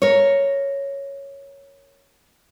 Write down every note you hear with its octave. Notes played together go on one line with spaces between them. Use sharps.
A#4 C#5